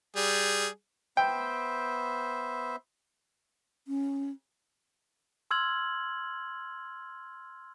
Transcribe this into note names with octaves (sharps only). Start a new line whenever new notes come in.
G3 G#4
B3 C5 E5 G5
C#4
C6 E6 F6 G#6 F#7